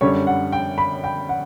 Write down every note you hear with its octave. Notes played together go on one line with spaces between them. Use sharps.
F#2 D3 G3 C#5
F#5
G5
B5
G5
F#5